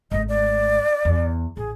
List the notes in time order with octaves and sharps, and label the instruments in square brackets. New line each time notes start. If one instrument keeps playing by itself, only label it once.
[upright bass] G#1 A3 [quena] D#5
[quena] D5
[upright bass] E2
[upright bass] A1 [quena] G#4